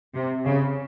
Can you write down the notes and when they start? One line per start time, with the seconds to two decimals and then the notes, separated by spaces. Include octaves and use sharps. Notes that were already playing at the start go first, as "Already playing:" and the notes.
0.14 C3
0.46 C#3